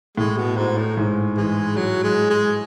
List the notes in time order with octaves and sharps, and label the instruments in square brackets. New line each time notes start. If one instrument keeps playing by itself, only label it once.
[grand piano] A2 [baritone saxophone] G#3
[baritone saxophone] B2
G#2
A2
[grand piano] G#2
[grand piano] E3 [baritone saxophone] G#3
[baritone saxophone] F#3
G#3
G#3